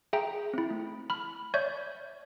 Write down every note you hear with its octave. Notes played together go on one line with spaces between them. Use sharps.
G#4 E5 G5 A#5
C4 E4
A3
B5 F6
C#5 D5 E5 C#6 G6